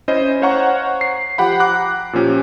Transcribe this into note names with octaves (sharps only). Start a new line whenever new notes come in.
C#4 E4 C5 D#5
C5 C#5 F5 F#5 A#5 C#6
C7
F3 G4 F#5 G5 B5
A#5 D6 F#6
A#2 F3 C#4 G4